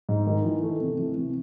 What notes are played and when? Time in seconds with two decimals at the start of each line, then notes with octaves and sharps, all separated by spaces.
0.09 G#2
0.27 D#3
0.45 E3
0.63 A3
0.81 C3
0.99 E3
1.17 C3